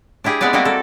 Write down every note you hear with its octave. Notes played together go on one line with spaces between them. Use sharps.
D4 E4 G4 G#4
G3 G#3 B3 C4 B4 D5
G3 G#3 A#3 C4 F#4 G4
A4